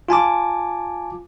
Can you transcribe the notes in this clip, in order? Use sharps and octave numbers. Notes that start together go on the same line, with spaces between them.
F4 G#5 A5 D6